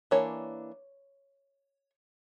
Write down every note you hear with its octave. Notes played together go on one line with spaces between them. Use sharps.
E3 A#3 D4 C#5